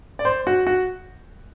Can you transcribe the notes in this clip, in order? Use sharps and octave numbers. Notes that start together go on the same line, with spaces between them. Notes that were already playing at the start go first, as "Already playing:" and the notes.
D5
C5
F#4
F#4